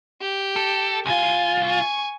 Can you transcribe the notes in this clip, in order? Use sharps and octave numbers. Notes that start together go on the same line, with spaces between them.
G4
A4
C2 F4 G#5
G#5 C#6